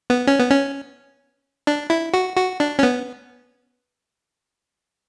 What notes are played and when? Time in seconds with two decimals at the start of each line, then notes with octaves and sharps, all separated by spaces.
0.10 B3
0.27 C#4
0.39 B3
0.51 C#4
1.67 D4
1.90 E4
2.14 F#4
2.37 F#4
2.60 D4
2.79 C#4
2.83 B3